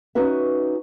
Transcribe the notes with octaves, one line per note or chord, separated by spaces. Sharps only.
C#4 D#4 F#4 B4 E5